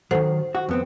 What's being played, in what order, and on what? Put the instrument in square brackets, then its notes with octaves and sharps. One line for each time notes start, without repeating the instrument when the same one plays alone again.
[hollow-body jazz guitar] D#3 E3 F#3 [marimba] A4 C5 F#5
[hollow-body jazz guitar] F#4
F2 B3 C4